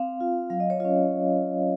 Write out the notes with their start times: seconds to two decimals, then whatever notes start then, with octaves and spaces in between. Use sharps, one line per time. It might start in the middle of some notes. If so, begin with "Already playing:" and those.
Already playing: C4 F5
0.20 F4
0.50 F#3 F5
0.60 D#5
0.70 C#5
0.80 C#4 F4 D#5